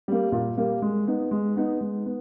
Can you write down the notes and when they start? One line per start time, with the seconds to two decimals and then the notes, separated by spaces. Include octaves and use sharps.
0.08 G3 A#3
0.32 A#2
0.58 G3 A#3
0.82 G#3
1.07 B3 D#4
1.31 G#3
1.56 B3 D#4
1.81 G#3
2.06 B3